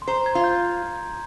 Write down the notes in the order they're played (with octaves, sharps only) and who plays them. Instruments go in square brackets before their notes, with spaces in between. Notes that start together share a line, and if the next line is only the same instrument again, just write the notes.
[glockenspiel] C6
[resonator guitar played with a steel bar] C5 [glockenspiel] A#5
[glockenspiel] G#6
[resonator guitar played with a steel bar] F4
[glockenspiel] G6